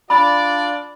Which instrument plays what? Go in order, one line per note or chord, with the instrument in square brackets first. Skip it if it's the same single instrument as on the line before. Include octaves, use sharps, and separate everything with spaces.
[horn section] D4 F4 D5 [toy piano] B5